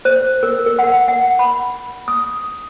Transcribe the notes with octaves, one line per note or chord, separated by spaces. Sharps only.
C5
A#4
A#4
F#5
F#5
B5
D#6